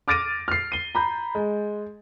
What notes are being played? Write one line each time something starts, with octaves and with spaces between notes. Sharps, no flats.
D6 F6 A6 A#6 D7 D#7
F6 C7
D#7 G7
A#5 B5 G6
G#3